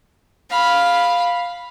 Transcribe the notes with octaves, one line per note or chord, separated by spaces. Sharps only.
F5 B5